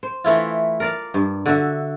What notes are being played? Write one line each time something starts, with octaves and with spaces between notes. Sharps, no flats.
C5
E3 A3 E4 F4
A#4 D5 F5
G2
D3 F#4 E5